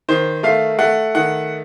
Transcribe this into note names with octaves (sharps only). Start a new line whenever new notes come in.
D#3 C5
A3 F5
A3 F#5
D#3 F#5